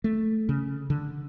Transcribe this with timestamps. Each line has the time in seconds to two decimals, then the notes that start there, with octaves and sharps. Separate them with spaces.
0.04 A3
0.49 C#3
0.90 D3